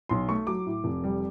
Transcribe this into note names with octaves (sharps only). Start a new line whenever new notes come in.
B1 C6
A3 C#6
F#3 D6
A2
F1
G3